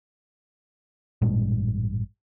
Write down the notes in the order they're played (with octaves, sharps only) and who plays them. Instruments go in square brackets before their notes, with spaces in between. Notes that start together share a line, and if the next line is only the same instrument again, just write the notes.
[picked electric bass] A1 G2 A#2 G#3